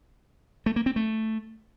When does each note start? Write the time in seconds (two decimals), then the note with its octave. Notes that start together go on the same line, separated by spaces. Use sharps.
0.66 A3
0.76 A#3
0.86 C4
0.96 A3